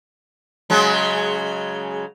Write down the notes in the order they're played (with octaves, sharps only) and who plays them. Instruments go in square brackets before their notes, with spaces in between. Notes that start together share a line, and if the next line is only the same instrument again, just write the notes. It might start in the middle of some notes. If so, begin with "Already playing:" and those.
[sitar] C#3 F#3 G#3